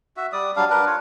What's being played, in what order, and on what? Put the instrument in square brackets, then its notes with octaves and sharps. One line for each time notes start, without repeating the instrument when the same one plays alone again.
[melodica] F#4 E5
G3 D5 D#6
F#3 G3 D4 F5
D4 A#4 B4
F4 C#5